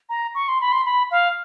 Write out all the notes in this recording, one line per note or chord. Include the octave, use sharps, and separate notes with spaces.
A#5
C#6
C6
B5
C6
B5
F5